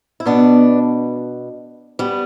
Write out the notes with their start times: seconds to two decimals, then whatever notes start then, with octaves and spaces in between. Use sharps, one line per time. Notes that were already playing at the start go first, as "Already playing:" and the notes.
0.20 E4
0.26 B2 B3 D4
1.99 G3 B3